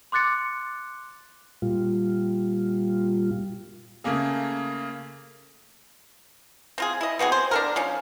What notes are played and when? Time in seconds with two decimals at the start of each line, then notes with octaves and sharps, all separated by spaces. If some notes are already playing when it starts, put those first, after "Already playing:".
0.12 C6 D6 F#6 A6 C#7
1.62 A#2 G3 F4
4.04 C#3 A3 A#3 G#4
6.78 C4 F4 G#4
7.01 E4 D#5
7.19 B3 C4 F#4 G#4
7.32 C5
7.51 D4 A4 A#4
7.76 F3 C#4 D#4